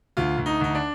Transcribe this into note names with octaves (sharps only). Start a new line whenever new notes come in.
D2 F4
D2
D#4
D2 D#4
D4